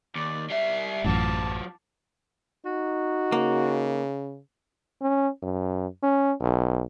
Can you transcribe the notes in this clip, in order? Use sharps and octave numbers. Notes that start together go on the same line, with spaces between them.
D#2 D5
G3 E5 C7
A1 F#2 A2 F#3 F4 A5 D6
D#4 F#4
C#3 A#3
C#4
F#2
C#4
B1